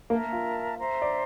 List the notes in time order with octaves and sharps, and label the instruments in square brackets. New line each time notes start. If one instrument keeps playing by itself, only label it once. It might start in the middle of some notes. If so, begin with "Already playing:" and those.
[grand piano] A#3 [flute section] A#4 E5 A5
[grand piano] F4
[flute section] C5 E5 A#5
[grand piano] D5